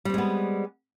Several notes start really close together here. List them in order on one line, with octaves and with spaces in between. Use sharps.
G3 C4 G#3 B3